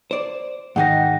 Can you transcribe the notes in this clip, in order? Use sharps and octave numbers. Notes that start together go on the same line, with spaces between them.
C5 D5
G#2 D#3 D#4 F#5 G5 A#6